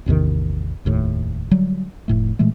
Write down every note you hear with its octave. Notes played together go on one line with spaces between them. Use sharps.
A1 E2 C3 D#3
F1 D#2 A2
D3 F#3 G3
F1 A2 A3
A#2 E3 G#3 A3